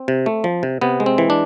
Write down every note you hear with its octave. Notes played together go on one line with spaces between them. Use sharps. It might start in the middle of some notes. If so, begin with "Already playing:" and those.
Already playing: C4
C3
A3
F3
C3
C3 B3
G#3
C4
E3
D4